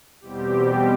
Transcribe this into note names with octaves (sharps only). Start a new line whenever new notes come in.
E2 B2 G3 C4 G4